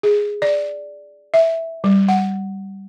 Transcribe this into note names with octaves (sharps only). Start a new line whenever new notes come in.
G#4
D5
E5
G3
F#5